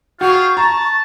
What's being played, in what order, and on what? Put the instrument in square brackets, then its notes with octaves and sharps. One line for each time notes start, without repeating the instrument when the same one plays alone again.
[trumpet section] F4 G#4 G5 [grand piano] F#4 [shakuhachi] C#6
[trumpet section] A5 [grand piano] A#5